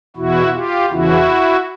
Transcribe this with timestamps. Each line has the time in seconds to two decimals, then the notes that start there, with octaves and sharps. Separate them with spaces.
0.16 E2 B2 E4 F#4
0.52 F4 G4
0.90 E2 C#3 E3 E4 F#4